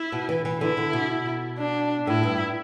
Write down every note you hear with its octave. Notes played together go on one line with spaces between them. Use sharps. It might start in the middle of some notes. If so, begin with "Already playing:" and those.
Already playing: E4
B2
E3
E3
D3 E4
D3
B2
D4
A2 E4
G2